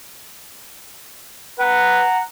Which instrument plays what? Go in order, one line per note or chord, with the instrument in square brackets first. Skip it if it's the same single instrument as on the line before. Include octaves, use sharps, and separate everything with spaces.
[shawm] B4 [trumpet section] F#5 A#5